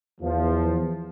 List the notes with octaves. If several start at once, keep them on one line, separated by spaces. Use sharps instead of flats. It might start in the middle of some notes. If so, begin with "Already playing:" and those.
E2 F3